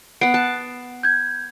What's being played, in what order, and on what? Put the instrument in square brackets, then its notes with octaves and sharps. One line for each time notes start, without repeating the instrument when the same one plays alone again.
[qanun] B3 F#5 [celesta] C7 D7
[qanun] A5
[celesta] G6 G#6